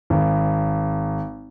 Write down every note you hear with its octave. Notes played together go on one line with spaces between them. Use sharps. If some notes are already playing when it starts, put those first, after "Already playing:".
G#1